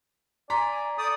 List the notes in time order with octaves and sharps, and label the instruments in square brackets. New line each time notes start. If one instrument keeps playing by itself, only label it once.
[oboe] D5 [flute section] G#5 [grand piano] A#5 C6 B6
[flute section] A4 G6 [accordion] D5 D#6